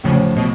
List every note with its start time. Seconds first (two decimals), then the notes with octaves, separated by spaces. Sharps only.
0.04 A1 A2 C#3 F3
0.36 B2